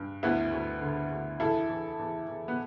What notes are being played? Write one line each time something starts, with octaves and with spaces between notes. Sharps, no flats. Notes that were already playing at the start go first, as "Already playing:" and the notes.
Already playing: G2
D2 B3 E4
D2
D3
D2
E2 E4 A4
E2
E2
E2
B3